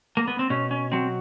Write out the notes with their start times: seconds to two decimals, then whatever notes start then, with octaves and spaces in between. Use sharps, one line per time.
0.17 A#3
0.28 B3
0.39 C4
0.50 B2 C#4
0.71 C#4
0.92 F#3 C4